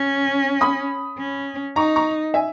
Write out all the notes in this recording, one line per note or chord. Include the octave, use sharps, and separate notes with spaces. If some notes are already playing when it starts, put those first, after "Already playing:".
Already playing: C#4
B5 D#6
C#4
D#4 A#5 C#6
A#5 C#6
E5 G#5